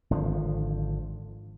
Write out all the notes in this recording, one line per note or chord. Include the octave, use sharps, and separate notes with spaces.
G#1 D3 F3